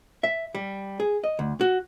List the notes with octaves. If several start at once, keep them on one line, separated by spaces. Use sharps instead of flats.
E5
G3
G#4
D#5
D2
F#4